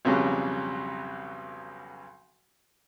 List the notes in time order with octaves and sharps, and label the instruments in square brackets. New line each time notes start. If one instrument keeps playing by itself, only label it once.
[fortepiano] B1 F2 C#3 F#3 G3